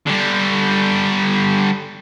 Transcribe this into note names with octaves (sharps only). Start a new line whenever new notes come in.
D3 G3